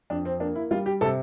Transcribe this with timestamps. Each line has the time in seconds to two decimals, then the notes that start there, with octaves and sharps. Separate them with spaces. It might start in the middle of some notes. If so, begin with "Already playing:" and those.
0.10 F2 D4
0.25 C4
0.40 A#3 D4
0.55 E4
0.71 G3 F4
0.86 G4
1.01 C3 A4